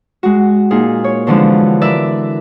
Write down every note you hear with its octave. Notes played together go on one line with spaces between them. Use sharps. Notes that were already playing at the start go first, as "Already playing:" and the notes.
G#3 F#4
A#2 D#4 G#4
C#5
B2 D3 E3 F3 G#3
A#4 B4 D5 E5